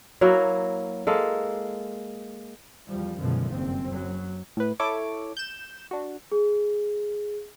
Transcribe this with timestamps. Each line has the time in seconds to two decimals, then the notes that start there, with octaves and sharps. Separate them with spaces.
0.21 F#3 A#3 E4 F#4
1.07 G#3 A#3 A4
2.88 E2 F3 G3
3.19 F#2 B2 D3 D#3 F3 G#3
3.52 F#1 G2 C4
3.87 F#2 F#3
4.57 A2 B4
4.80 E4 A4 C#5 D6
5.37 G6 E7
5.91 D4 F#4
6.31 G#4